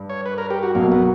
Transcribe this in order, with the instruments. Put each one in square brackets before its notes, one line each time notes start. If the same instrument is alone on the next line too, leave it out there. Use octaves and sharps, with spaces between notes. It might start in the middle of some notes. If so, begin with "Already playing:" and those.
Already playing: [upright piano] G2
[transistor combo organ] C#5
B4
A#4
G4
F#4
[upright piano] B1 B2 F#3 [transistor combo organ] A#3
[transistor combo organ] B3